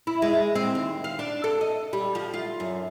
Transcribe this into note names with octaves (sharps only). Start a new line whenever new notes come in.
E4
G#3
C4
D#2
F5
D4
A4
D#5
G3
F3
F4
F#2